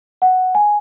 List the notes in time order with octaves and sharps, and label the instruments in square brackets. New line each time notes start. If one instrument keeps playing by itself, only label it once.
[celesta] F#5
G#5